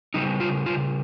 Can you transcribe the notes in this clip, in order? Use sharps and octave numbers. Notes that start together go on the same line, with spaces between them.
C#3 G3 D#4
F4
F4